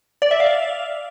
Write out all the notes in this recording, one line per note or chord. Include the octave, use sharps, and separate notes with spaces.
D5
E5
F5